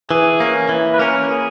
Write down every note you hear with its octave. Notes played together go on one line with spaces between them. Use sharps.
E3 G#4
A#3 C#4
E3
B4
A#3 C#4 A#4
G#4